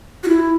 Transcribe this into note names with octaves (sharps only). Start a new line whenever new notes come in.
F#4
E4